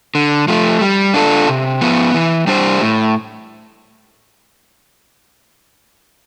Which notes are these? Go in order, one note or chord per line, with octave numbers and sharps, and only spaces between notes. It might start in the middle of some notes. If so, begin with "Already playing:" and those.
D3
F3 A3
G3
D4 F4 A4
C3
F3 B3
E3
G3 D4 G4 C5
A2